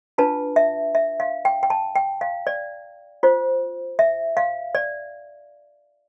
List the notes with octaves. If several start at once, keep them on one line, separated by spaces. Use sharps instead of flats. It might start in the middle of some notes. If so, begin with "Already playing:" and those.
D4 F4 B4 A5
E5
E5
F5
G5
G5
A5
G5
F5
D5
F4 C5
E5
F5
D5